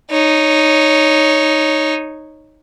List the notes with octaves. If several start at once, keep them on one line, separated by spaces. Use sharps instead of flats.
D#4 C#5